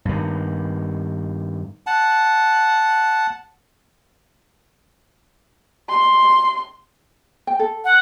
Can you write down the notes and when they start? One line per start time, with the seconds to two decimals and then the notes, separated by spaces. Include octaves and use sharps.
0.05 G2 D#3
1.87 F#5 A5
5.90 C6
7.47 G5
7.59 A4
7.84 F#5